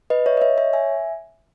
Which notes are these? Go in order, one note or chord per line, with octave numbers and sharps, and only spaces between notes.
B4 D#5
C#5 E5
D#5
C#5 E5
C#5 E5
E5 G#5